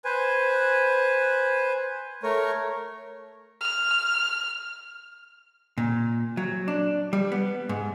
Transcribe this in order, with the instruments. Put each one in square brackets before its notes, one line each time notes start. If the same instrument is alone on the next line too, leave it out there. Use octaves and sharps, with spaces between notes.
[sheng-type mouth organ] B4 C5 G#5
A3 A#4 C#5
[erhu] F6
[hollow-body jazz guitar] A#2
F#3
D4
G3
B3
G#2